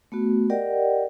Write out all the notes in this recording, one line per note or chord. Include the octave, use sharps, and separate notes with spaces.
A3 B3 F#4
G4 A#4 D5 D#5 F#5 G5